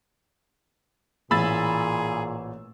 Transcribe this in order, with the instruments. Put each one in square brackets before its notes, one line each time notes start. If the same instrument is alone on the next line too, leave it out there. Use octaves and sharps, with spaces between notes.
[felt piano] A1 [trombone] A#2 [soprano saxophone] G#4 [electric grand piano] B5 E6 A6